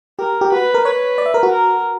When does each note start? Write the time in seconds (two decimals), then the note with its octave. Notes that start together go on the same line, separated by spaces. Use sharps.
0.19 G4 A#4
0.41 G4
0.52 F#4 B4
0.74 A#4
0.85 B4 C#5
1.18 D5
1.26 E5
1.34 A#4
1.43 F#4
1.51 A#4